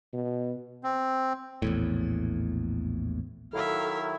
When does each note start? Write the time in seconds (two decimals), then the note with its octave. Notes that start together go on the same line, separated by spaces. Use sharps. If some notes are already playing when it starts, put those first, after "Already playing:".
0.13 B2
0.84 C4
1.62 A#1 E2 A2
3.53 D#3 F#3 E4 A4 E5 F5